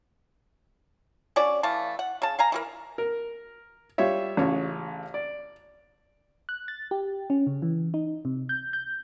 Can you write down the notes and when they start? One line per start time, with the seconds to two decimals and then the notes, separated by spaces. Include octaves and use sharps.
1.36 C#4 D4 F#4 D5
1.63 E3 A3 F5 A5
1.99 F#5
2.22 C#3 A5
2.39 F5 G#5 A#5
2.52 E3 F#4 A#4
2.98 A#4
3.98 G3 F4 C#5 E5
4.37 A1 C#3 F4 C#5
5.14 D5
6.49 F#6
6.68 A6
6.91 G4
7.30 C#4
7.47 C#3
7.62 E3
7.94 D#4
8.25 C3
8.49 G6
8.73 G6